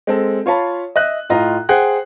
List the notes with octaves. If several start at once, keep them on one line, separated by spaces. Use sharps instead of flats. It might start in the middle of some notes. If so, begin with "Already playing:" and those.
G#3 C4 A4
F4 C#5 F5 A5 B5
D#5 E5 F#6
A2 F4 D#5 A#5
G#4 C5 F#5 G5 F#6